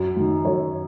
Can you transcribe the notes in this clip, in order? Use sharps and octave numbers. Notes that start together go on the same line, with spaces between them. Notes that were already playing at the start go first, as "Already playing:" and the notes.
Already playing: F#2
D#3 F#3
F#2 C#5